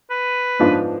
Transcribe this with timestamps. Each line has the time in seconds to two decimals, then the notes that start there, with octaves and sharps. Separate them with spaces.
0.10 B4
0.59 G#2 F3 B3 D4 F4